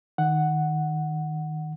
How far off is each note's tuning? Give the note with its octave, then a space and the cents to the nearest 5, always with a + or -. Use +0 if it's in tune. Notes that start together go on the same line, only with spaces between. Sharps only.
D#3 +0 F#5 +0